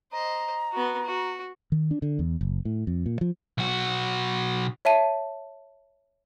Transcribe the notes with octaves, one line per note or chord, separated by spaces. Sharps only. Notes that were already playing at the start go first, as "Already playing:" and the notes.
C5 D#5 A#5
B3 F#4
F#4
D#3
D4
D3
E2
F#1
A2
F2
A#2
F3
B1 F#4
C#5 E5 A5 D#7